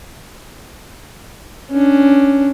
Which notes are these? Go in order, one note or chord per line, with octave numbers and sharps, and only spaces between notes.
C#4 D4